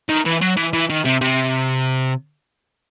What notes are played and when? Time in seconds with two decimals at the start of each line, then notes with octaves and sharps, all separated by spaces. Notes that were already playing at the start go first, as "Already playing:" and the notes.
0.09 D#3
0.26 E3
0.42 F#3
0.57 E3
0.74 E3
0.90 D#3
1.05 C3
1.21 C3